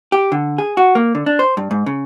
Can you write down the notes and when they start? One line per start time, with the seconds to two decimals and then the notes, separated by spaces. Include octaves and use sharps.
0.12 G4
0.32 D3
0.58 G#4
0.77 F#4
0.95 A#3
1.15 D3
1.26 D4
1.39 C5
1.57 G2
1.71 G#2
1.86 C#3